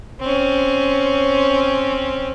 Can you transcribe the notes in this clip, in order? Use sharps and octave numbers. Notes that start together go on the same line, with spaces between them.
C4 C#4